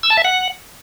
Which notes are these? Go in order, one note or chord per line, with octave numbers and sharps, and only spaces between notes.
E6
A5
E5
F#5